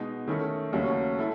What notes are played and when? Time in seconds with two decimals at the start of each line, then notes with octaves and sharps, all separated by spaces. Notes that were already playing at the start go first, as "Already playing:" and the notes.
Already playing: B2 G#3 D#4
0.27 D#3 A3 C#4 E4 A4
0.73 D#2 C#3 F#3 A3 C#4
1.18 A3 E4 A4